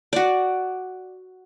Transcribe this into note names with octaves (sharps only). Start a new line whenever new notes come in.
F#4 D5